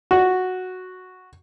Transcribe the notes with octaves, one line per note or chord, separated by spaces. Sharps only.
F#4